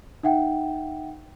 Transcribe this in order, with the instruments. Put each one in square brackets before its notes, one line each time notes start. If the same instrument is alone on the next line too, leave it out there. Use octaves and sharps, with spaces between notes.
[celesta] D#4 E5 F#5 G5